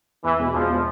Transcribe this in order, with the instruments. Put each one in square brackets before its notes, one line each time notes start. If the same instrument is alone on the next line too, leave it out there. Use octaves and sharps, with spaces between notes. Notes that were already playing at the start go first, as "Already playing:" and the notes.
[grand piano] E2 [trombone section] E3
[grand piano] B2 G#3
[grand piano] E2 [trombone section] F3
[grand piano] B2 G#3